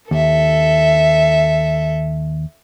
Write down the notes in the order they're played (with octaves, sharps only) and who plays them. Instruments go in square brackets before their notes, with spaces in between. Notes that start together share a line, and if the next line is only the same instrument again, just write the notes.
[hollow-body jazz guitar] D#2 [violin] A4 E5